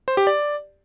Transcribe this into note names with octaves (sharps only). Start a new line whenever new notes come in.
C5
G4
D5